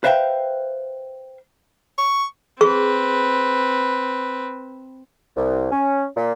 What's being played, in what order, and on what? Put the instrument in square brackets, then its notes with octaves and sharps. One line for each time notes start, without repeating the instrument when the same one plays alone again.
[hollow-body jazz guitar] B4 C5 E5 F5 G5
[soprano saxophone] C#6
[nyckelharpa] C4 B4 [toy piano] G#4 C#6
[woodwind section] C2
C#4
A#2